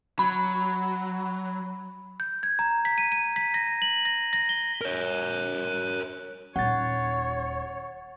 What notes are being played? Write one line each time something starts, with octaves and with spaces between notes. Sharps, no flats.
F#3 B5
G6
G#6
A#5
B6
D#7
D#7
B6
A#6
F#7
A#6
A#6
G7
A#4 C#5
D#1 D#4 C#5 F#5 A6